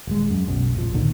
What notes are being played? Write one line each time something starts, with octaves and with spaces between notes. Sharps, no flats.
D#1 G#3
F#2
F#1 B1 F#2
A#1 F2 F3
D2 A#2 D3 D#3